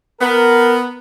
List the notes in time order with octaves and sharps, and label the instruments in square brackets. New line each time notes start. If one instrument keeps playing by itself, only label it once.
[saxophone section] B3 [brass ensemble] A#4